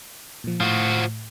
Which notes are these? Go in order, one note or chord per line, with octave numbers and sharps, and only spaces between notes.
A#2 F3
A2 F3 F#4